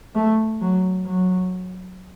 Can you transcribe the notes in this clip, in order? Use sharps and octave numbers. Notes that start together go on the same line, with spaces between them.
A3
F#3
F#3